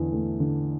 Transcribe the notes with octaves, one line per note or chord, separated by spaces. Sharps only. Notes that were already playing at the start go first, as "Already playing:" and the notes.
Already playing: E2 D3
A3
D3